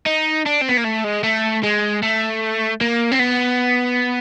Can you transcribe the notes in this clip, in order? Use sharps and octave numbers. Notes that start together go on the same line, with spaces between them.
D#4
D4
C4
B3
A#3
A3
G#3
A3
G#3
A3
A#3
C4
B3